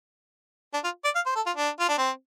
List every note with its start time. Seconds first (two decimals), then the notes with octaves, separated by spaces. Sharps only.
0.74 D4
0.84 F4
1.05 D5
1.15 F5
1.26 C5
1.36 A4
1.46 F4
1.56 D4
1.80 F4
1.89 D4
1.98 C4